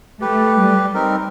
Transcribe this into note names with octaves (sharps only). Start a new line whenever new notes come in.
A3 G4 B4
G3
C4 D#4 A#4